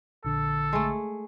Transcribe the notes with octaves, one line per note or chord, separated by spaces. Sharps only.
A#1 D3 A4
G#3 A3